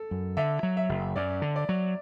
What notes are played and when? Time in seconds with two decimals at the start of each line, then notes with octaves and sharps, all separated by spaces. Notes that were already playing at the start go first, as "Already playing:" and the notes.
Already playing: A4
0.11 F#2
0.37 D3 E5
0.63 F#3
0.77 E5
0.89 F#1
1.16 F#2 D5
1.42 D3
1.56 D5
1.69 F#3